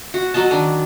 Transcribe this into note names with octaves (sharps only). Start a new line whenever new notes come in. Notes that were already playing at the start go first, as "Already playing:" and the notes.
F#4
F#3 F#4 D#5 A5
D#3 D4